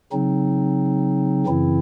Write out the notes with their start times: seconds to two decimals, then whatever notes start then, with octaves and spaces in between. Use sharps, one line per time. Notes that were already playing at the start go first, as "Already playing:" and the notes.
0.12 C#3 F#3 C4 D#4
1.47 F#2 C#3 E3 C4 E4